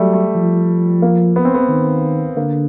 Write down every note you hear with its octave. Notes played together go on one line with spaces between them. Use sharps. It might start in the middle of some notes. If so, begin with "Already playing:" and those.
Already playing: F#3 G3 A3
A3
F3
A#3
B3
C4
B3
D#3
D3 A#3